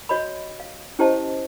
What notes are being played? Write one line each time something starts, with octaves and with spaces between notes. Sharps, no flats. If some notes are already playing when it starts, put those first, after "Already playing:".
F#4 C#5 D#5 B5
F5
C#4 E4 G4 C5 D#5 A5